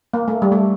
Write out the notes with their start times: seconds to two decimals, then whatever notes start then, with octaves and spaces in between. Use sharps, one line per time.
0.14 A#3
0.28 A3
0.42 G3
0.52 A3